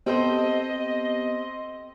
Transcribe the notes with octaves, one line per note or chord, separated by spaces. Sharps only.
B3 C4 G4 A4 C5 D#5